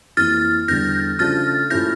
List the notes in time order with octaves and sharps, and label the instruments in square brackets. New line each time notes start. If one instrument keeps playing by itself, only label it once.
[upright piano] F2 E3 A#3 [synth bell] F6 A6
[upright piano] E2 D3 G3 [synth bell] G6 A#6
[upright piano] C#3 F3 A3 D4 [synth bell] F6 A6
[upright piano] A#2 F3 A3 C#4 E4 [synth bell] G6 A#6